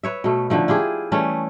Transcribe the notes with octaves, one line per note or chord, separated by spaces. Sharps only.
B4 C#5 E5
B2 A3
D3 D#3 F3 A3
E4 F4 G4 G#4
E3 G3 A3 C#4